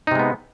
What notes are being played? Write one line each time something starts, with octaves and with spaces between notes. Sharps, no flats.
C3 G#3 B3 D#4